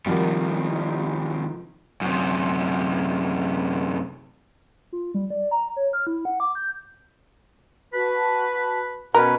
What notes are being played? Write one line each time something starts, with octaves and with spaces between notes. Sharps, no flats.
D#2 C3 F3 G3 D#4 F#4 A#4
F#2 C3
F4
G3
D5
A#5
C#5
F6
E4
F#5
D6
G6
F#4 B4 A5
B2 C#4 A#4 B4